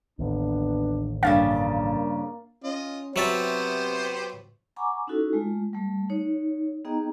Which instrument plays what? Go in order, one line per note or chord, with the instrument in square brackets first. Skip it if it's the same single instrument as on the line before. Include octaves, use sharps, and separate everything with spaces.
[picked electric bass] A1 D#2 [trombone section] B3 D4
[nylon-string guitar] G2 C#3 G3 [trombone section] A#3 [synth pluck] F5 A6
[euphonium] C#4 [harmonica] F4 D#5
[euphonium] C3 [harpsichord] F#3 E5 A5 [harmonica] B3 G4 C5
[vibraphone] F#5 G#5 A#5 B5 C#6 D6
C#4 D#4 E4 F#4 A4
G#3 A3 F4
G3 A3
D#4 C#5
B3 D#4 G#4 D#5 G5 A#5